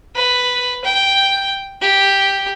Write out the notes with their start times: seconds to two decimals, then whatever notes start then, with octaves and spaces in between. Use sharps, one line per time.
0.16 B4
0.84 G5
1.82 G4